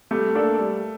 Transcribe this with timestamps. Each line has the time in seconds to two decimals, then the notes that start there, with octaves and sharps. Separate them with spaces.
0.11 G3 A3
0.35 A#3 D4 A4 D5
0.59 G3